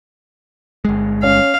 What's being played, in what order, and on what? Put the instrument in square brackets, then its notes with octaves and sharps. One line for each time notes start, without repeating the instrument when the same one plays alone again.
[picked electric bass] G1 G#3
[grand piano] C#4 [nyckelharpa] F5